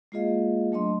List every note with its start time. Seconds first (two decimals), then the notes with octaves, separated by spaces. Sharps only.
0.12 G#3 A#3 F4 G#4 D#5 F5
0.72 F#3 A3 D4 D#5 C6